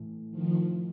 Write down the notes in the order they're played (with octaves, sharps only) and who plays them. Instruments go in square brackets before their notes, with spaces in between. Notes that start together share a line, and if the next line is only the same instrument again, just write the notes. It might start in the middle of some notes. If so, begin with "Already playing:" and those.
Already playing: [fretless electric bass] A2 E3 A3
[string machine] D#3 F3